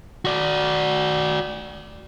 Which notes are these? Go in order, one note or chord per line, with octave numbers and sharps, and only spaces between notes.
F#4 D5